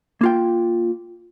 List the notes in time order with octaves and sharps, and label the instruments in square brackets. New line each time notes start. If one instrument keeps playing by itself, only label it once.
[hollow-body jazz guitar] A#3 F4 G5